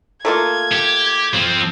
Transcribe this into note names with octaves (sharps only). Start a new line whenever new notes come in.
A3 A#3 F4 G#6
G4
F3 C4